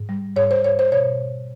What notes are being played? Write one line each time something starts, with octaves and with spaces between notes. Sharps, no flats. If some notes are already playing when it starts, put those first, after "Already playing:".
Already playing: G#2
G3
G#2 C#5
C5
G#2 C#5
C5
B2 C#5